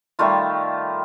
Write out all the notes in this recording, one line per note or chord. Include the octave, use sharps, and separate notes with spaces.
D#3 G3 A3 F4